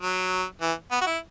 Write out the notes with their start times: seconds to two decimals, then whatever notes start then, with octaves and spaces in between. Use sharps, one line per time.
0.01 F#3
0.62 E3
0.92 B3
1.01 F#4
1.07 E4